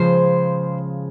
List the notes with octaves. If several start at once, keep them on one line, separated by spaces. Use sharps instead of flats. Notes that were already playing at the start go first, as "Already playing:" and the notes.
Already playing: C#3 F3 G#3 C5